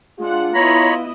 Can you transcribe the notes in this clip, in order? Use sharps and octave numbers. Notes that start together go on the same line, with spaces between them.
G#3 D4 F4 F#5
B3 E4 C#5 D#5 A#5 B5